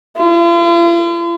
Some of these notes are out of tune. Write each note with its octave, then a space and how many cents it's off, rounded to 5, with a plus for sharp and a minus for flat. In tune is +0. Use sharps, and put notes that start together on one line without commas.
F4 -45